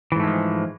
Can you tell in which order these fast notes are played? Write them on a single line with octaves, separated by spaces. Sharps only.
E3 G#2 A3 G#3 F3